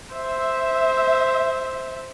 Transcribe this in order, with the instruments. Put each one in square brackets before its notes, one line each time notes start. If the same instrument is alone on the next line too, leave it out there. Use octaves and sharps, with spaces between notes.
[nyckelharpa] C5 [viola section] E5